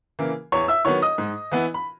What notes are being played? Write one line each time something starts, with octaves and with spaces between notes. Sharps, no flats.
C#3 E3 A#3
E2 C#5 C#6
E5 E6
D#3 F#3 B3 C#5 C#6
D#5 D#6
G#2
E3 B3 E4
B5